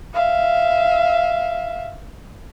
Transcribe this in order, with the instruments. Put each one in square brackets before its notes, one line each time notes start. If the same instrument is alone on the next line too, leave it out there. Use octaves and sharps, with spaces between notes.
[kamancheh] E5 F5